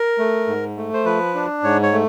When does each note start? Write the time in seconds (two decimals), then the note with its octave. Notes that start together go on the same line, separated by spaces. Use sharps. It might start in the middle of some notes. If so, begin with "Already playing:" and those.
Already playing: A#4
0.18 A3
0.47 G#2
0.77 A3
0.94 C5
1.05 F3 B4
1.35 D4
1.63 G#2 C#5
1.83 C#5
1.92 A3